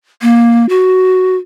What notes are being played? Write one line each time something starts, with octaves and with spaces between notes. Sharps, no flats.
A#3
F#4